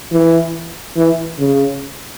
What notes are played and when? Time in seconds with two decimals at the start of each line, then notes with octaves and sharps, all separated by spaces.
0.12 E3
0.97 E3
1.39 C#3